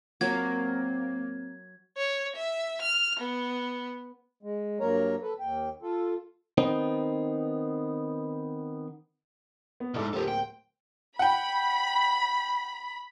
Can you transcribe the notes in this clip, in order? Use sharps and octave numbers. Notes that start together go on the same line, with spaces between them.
F#3 A#3 C4 G#6
C#5
E5
F6
B3
G#3
G2 F#3 A#3 A#4 C#5 A#5
A4 B4
D#2 G5
F4 A4
D#3 B3 C4 D#4
B3
B1 G#2 E4 A4 D5
D1 A#3 G4 A4 C5
G5
F#5 G5 B5